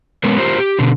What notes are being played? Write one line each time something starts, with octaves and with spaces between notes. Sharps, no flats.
G#3 B3 C#4 A#4
F4 G4 A#4 C5
G4
B2 D3